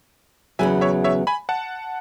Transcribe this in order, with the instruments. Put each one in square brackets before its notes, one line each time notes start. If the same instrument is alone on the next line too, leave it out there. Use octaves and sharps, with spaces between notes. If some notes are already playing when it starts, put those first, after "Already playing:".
[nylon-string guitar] E2 C#3 F#3 [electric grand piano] E5 G#5
[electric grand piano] C#5 E5
C#5 E5
G#5 B5
F#5 A5